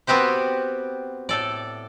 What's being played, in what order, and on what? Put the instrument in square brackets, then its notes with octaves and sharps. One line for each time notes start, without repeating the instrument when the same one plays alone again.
[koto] B3 C4 F#4 G4 C5
A2 A4 D5